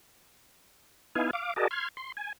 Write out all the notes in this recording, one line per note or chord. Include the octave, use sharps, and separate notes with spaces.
B3 D#4 E4 F5 G#5
F5 D6
F#4 G#4 A#4 D5 D#5 A5
C6 F6 G#6
C6
G#5